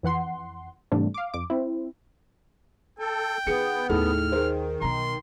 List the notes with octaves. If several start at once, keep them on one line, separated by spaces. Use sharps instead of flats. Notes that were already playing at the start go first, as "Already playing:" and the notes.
F2 E3 F#5 C6
G#2 C3 E3 G3 A3 D4
F5 D6
F2 D6
C4 E4
A4 G5
D#3 B3 G#4 C#7
D#2 A2 G#4 A4 F6
D#3 G#4 A#4 C5
B1 G3 A#5 C6